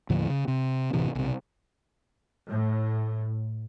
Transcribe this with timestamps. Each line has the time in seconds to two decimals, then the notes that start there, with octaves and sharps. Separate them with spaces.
0.10 D#2 A2 D3 F3
0.30 C#3
0.48 C3
0.93 D1 A1 C3 E3
1.15 B1 C3
2.49 A2